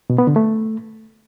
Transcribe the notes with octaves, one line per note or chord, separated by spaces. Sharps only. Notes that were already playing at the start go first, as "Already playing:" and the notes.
B2
B3
D3
A3